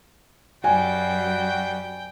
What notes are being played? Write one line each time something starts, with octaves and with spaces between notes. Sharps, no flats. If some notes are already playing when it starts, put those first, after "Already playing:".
F#2 G3 F#4 G5 G#5